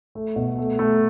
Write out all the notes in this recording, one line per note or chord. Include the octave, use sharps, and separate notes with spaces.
A3
B2
A3
A3